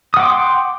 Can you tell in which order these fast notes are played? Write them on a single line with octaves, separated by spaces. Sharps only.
D#6 F#5 D6 G5 C6